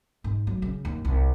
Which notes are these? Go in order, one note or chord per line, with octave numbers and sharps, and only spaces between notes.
G#2
F#3
C#3
D#2
C2